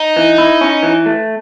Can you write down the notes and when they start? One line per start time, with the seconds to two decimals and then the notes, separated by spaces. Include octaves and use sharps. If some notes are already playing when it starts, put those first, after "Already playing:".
Already playing: D#4
0.17 E3
0.38 E4
0.61 C#4
0.83 E3
1.06 A3